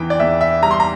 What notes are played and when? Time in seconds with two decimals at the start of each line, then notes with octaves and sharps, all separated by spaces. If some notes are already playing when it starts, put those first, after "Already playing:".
Already playing: E2 E3 G5
0.10 D5
0.20 E2 E5
0.41 E5
0.63 G3 A#5
0.71 C6
0.80 A#5